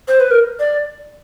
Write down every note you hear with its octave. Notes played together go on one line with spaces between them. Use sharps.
C5
B4
A#4
D5